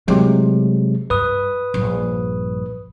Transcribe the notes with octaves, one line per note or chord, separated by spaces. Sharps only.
C3 E3 F#3 G#3 A3
G2 B4 D#6
A#1 G2